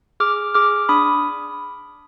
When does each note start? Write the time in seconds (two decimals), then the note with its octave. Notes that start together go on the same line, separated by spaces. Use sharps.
0.20 G#4 D6 F6
0.54 G#4 D6 F6
0.89 D4 B5 D#6